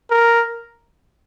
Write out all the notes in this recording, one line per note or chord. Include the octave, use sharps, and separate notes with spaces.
A#4